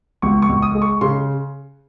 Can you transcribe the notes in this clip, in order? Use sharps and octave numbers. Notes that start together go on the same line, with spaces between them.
C#2 C#6
C#6
C#2
D#6
G#3
C#6
C#3 C6